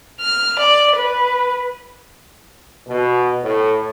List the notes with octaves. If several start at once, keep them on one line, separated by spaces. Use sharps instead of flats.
F6
D5
B4
B2
A2